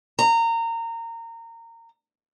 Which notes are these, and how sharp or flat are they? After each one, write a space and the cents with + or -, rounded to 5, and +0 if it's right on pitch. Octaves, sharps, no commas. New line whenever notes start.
A#5 -25